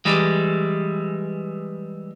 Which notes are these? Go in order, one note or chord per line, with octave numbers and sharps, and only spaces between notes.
E3 G3 G#3